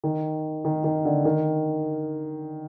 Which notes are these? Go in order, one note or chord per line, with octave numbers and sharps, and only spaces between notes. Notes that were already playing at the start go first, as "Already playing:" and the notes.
D#3
D#3
D#3
D3
D#3